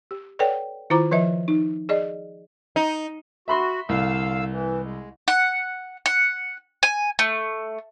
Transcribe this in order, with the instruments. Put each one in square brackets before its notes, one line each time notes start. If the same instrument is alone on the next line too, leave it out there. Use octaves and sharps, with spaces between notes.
[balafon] G4
A4 B4 C#5 D5 F#5 G5
D#3 E4 F4 C5 A#5 D6
F3 B4 D#5 E5
D#4
G#4 D5 D#5
[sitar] D#4
[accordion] F#4 [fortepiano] E5 B5 C6
[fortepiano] C2 [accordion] D3 F5 E6
[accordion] E3
G#3
[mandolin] F#5
F#5
G#5
A3